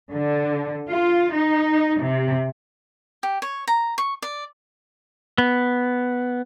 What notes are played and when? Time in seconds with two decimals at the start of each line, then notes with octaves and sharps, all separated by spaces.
0.11 D3
0.87 F4
1.33 D#4
2.00 C3
3.23 G4
3.42 C#5
3.68 A#5
3.98 C#6
4.22 D5
5.38 B3